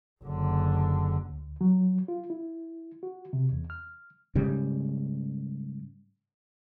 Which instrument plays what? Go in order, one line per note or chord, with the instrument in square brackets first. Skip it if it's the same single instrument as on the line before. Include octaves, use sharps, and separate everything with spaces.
[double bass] F#1 D3
[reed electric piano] D2
F#3
F4
E4
F#4
C3
E2
F6
[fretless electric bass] G#2 C#3 G3